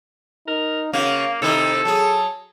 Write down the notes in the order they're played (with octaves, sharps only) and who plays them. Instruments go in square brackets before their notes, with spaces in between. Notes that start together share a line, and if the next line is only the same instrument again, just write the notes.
[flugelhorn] D#4 [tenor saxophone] A#4
[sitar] C#3 C#4 F#4 [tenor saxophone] A#3 [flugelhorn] F5
[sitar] C3 D#3 E4 [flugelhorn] D#4 [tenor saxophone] A4
[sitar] F#3 G#4 [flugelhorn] A5